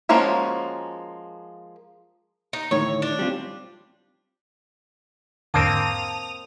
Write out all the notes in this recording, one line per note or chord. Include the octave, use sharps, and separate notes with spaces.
F3 G#3 A#3 C#4 F#4
D#4
D2 A2 D#3 C#5
D4
G3 C4 F4
E2 G#2 D3 A#3 C4 A5 D#6 F7